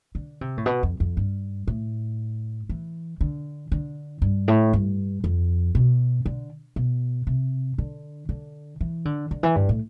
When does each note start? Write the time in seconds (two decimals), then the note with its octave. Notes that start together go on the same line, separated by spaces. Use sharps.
0.15 D3
0.41 C3
0.57 A2
0.66 B2
0.83 F2
1.00 F2
1.17 G2
1.67 A2
2.69 E3
3.21 D3
3.72 D3
4.22 G2
4.48 A2
4.73 G2
5.24 F2
5.75 B2
6.26 D3
6.76 B2
7.27 C3
7.78 D3
8.29 D3
8.81 E3
9.05 D3
9.31 D3
9.43 E3
9.56 G2
9.69 A2